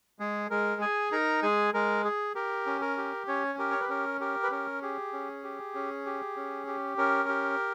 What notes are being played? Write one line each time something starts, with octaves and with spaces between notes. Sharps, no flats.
G#3 G#4
G#3 A#4
G#4 G#5
D#4 A#4 A#5
G#3 G#4 G#5
G#3 A#4
G#4
G4 A#4
C#4
A#4
G4
C#4 C#5
G4 A#4
C#5
B4
C#4 A#4
G4 A#4
B4
C#4 A#4
G4 G#4
C#4
G4
C#4
G4
C#4
G4
C#4 A#4
G4